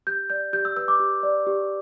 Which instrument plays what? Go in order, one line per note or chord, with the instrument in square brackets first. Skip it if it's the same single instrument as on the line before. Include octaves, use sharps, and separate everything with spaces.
[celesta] G4 G6
D5 G6
G4 G6
E6
B4 E6
D6
G4
D5
G4